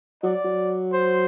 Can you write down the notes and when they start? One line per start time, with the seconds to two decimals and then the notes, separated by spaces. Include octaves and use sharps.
0.23 F#3 D5
0.44 F#3
0.93 C5